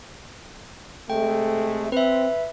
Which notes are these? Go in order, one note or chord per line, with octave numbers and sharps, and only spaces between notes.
C3 G#3 A3 G5
C4 B4 E5